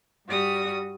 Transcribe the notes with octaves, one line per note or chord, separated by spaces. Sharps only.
G2 G3 F#4 D#6